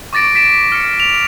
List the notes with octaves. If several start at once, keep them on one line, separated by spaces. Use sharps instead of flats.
C#6 D6 A6 A#6 D7
B6 D7 E7
F6 C#7
F7